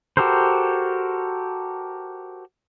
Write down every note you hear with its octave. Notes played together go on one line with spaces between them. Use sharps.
F#4 G4 A4 A#4 C5